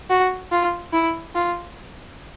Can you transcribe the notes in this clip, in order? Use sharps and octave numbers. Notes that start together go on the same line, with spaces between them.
F#4
F4
E4
F4